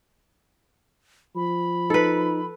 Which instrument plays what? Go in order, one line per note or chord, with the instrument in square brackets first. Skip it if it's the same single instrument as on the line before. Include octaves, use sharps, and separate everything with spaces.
[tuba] F3 [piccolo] B5
[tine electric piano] D#4 [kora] A4 B4